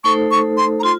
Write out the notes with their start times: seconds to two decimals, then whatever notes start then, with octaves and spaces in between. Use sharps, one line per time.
0.04 A3 D#4 A4 C5 C#6
0.31 C#6
0.57 C6
0.80 A#5
0.83 F4 C6